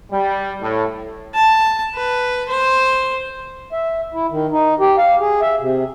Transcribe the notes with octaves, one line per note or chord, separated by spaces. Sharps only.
G3
A2
A5
B4
C5
E5
E4
D#3
D#4
G4
F5
G#4
E5
C3